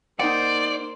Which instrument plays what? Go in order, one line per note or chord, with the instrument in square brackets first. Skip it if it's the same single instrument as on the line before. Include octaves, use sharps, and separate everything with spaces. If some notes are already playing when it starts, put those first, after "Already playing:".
[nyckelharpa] A#3 C5 [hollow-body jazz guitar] D#4 F#5 [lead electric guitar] D5